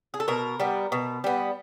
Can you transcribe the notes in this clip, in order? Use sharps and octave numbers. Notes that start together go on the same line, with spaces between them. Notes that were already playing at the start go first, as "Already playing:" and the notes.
G#4
A4
B2 A#4
G3 B3
B2
G3 B3